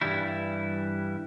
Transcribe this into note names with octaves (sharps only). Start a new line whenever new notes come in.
G2 E3 G3 E4